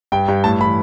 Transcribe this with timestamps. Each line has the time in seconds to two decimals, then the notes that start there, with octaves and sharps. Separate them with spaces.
0.12 G2 G5
0.28 G2
0.44 A2 A5
0.60 E3 B5